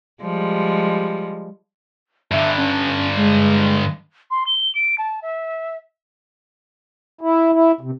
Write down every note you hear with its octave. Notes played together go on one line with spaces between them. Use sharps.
F3 G3 G#3
G2 D3 E5
C#4
G#3
C6
G7
D7
A5
E5
E4
E4
C3